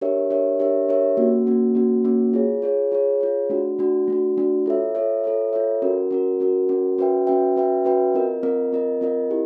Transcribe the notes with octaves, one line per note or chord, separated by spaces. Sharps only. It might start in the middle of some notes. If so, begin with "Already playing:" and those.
D4 G4 A#4 C#5 E5
D4 G4 A#4 C#5 E5
D4 G4 A#4 C#5 E5
D4 G4 A#4 C#5 E5
A#3 C#4 F#4
A#3 C#4 F#4
A#3 C#4 F#4
A#3 C#4 F#4
F4 G#4 C#5
F4 G#4 C#5
F4 G#4 C#5
F4 G#4 C#5
A3 D4 F#4
A3 D4 F#4
A3 D4 F#4
A3 D4 F#4
F4 A4 C#5 E5
F4 A4 C#5 E5
F4 A4 C#5 E5
F4 A4 C#5 E5
C#4 F#4 A#4
C#4 F#4 A#4
C#4 F#4 A#4
C#4 F#4 A#4
C#4 F#4 B4 E5 G5
C#4 F#4 B4 E5 G5
C#4 F#4 B4 E5 G5
C#4 F#4 B4 E5 G5
C4 F4 A#4 D#5
C4 F4 A#4 D#5
C4 F4 A#4 D#5
C4 F4 A#4 D#5
E4 G4